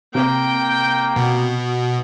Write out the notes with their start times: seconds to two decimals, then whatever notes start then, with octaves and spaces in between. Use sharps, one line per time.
0.15 C3 A#3 G5
1.16 B2